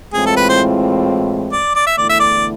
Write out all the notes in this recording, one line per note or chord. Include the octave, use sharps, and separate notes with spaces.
A2 E3 G#3 C4 F4 G#4
A4
B4
C5
D5
D5
E5
E2 D3 A3 E4 D5
E5
D5